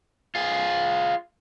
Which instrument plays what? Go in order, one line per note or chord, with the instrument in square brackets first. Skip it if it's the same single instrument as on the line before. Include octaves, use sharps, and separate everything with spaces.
[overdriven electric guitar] F4 G#4